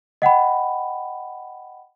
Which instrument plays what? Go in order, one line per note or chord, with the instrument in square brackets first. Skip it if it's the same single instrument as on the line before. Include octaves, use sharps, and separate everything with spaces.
[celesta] D#5 F#5 G5 B5